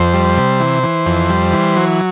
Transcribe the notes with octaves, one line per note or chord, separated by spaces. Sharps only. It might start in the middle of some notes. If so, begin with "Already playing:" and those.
Already playing: F2 C5
G3
C3
E3
E3
F2
G3
E3
F#3